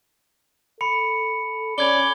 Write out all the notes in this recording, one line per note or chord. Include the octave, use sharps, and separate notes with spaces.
A4 B5 C#7
C#4 D5 B5 G#6 G7